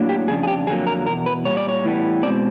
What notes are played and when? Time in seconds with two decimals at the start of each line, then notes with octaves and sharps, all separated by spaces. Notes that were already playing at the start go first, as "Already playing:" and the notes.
Already playing: A2 F#3 A#3 D4
0.09 G4
0.28 F2 C#3 D4 G#4
0.43 G#4
0.48 G4
0.67 F2 D3 F#3 A#3 G#4
0.87 A#4
1.06 E2 B2 A#4
1.26 B4
1.45 A#2 G3 C#5
1.57 D5
1.68 C#5
1.84 A2 E3 G3 B3
2.23 B2 G#3 C4 D5